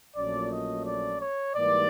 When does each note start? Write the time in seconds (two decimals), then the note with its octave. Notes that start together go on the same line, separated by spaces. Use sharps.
0.15 A#1 A#2 F#3 A3 C#4 D5
0.51 D#5
0.85 D5
1.20 C#5
1.55 G#2 E3 G3 A#3 D5